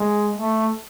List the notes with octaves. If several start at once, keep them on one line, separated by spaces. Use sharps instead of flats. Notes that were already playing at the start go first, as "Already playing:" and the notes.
Already playing: G#3
A3